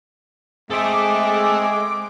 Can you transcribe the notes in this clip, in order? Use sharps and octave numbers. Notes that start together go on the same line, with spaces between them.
G#3 C4 G#4 A4 E5 D6